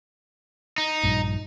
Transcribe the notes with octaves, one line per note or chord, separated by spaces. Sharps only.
D#4
A#1 G2